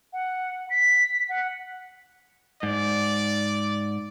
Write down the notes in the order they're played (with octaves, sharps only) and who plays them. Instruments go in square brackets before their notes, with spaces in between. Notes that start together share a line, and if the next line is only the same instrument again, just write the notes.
[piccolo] F#5
B6
F#5
[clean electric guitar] G#2 [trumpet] D5